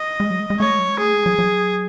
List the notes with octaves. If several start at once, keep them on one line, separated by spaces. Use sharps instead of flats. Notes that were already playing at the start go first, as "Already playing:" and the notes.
Already playing: D#5
G#3
F#3
G#3
G#3
A3 C#5
G#3
F#3
G#3
A3 G#4
G#3
F#3
F#3